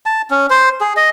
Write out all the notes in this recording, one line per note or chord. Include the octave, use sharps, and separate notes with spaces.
A5
C#4
C5
G#4
D#5